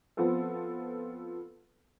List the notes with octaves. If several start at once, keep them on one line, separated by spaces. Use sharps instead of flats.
F3 B3 C4 F4 A4